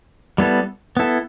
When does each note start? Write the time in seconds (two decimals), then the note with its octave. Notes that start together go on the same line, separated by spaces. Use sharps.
0.38 G3 B3 E4 A4
0.97 B3 E4 A4